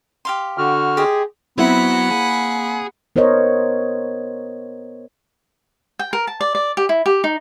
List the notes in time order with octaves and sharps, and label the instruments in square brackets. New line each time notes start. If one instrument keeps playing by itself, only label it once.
[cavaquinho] G4 F5 C6
[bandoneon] D3 F#4 F6
[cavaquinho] G4 C5 D#5 [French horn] G#4
[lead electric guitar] F#3 [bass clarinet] B3 [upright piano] C4 E4 [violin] F#5 B5
[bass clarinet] A#3 [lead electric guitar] G#4
[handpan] B3 A#4 C5 C#5 D#5
[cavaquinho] G5
A#4
A5
D5
D5
G4
E4
G4
D#4